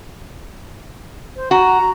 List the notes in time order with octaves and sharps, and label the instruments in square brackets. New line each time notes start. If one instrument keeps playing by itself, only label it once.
[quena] C5
[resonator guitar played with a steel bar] F#4 [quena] A#5